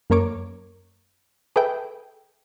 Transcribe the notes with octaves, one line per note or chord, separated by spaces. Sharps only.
F#2 A#3 A#4 C#5 D6
G#4 A4 B4 E5 G5